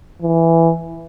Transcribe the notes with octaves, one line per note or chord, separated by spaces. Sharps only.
E3